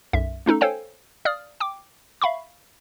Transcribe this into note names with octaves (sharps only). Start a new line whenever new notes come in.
B1 F#2 E5
A3 C#4 D#4 A4
A4 C5 C#5 F5 G5 G#5
D5 F5 D#6 F6
G5 D6
E5 F5 B5 C#6